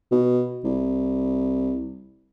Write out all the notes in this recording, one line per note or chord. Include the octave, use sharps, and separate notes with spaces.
B2
C2